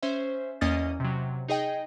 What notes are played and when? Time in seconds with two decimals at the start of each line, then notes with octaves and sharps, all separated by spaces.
0.03 C#4 C5 E5
0.61 E2 A#3 C#4 D#5 D#6 A6
1.00 C3 F#3
1.49 D#4 G#4 D#5 G5